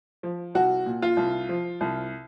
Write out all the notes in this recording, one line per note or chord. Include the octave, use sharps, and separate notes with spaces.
F3
C2 F#4
A#2
F4
C2
F3
C2